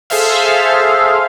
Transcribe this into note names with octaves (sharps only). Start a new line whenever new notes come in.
G#4 A4 C5 E5 F5